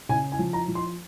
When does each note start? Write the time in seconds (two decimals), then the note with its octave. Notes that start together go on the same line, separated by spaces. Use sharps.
0.09 C#3 G#5
0.32 G#5
0.39 F3
0.53 A#5
0.68 F3
0.75 C6